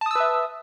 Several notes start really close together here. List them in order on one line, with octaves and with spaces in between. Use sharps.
A5 D#6 E6 B4 E5